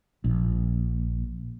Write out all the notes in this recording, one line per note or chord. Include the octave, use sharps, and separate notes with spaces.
A#1